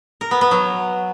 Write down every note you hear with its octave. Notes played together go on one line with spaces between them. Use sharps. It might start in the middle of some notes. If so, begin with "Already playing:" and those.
A#4
B3
B3
F#3